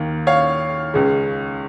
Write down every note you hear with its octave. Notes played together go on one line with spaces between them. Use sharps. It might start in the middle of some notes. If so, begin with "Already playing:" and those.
Already playing: D#2 D#3 A#3
C#5 F5
C#2 C#3 G#3